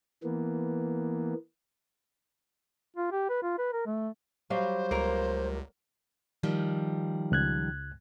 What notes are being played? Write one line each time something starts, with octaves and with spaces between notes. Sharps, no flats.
E3 A#3 B3
F4
G4
B4
F4
B4
A#4
A3
F#3 G3 C5 F5
C#2 A#3 A#4
D#3 F3 G3
C#2 F#6 G#6